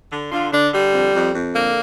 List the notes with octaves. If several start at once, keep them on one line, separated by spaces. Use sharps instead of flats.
D3
D3 F4
D3 D4
D3 G3
F2
F2
F2
D3 A#3